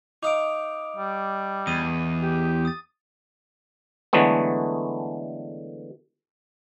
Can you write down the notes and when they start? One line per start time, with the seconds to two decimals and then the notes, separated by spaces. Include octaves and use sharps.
0.23 D#4 F5 D6 D#6 D7
0.96 G3
1.67 E2 D#6 D#7
2.21 G4
2.65 D#6 A6
4.13 D3 E3 F#3 G#3 A3 B3